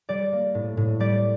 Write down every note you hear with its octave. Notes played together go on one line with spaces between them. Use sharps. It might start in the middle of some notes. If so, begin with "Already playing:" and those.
G3 D5
A#3
A2
A2
G3 D5